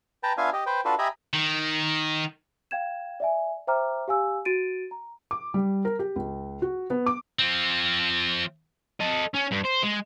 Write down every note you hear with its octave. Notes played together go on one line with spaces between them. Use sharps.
B4 G5 A5 A#5
B3 D4 F4 E5 F5 G#5
G4 D#5
B4 C5 G5
D4 F4 F#4 A4 B4
G4 D#5 E5 G#5 A#5 B5
D#3
F5 G5 G#6 E7
D5 E5 G#5
C5 E5 G5 A#5 D6 F6
G4 F5 G#5 E6
F#4 A6 D7 D#7
A#5
D6
G3
A#4
G4
C#2
F#4
B3
D6
F3 C4
A4 D#5
C#4
G2
C5
G#3